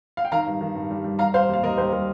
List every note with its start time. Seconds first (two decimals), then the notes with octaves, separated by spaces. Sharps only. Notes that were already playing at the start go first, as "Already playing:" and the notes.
0.17 F5
0.25 G5
0.32 D#3 F5 A#5
0.47 G2
0.61 D#3
0.75 G2
0.91 G3
1.04 G3
1.19 G3 F5 A#5
1.34 G3 C5 F5
1.49 D#2 F5
1.63 D#2 A#4 D#5
1.77 D#2 G4 C5
1.92 G3 A#4